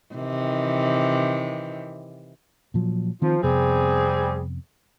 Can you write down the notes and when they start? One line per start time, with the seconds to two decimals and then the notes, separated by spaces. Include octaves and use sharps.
0.14 C3 D#3 E3
2.74 A#2 F3 F#3
3.22 D#3 F3 C4
3.43 F2 C3 G3 B3 C4 G#4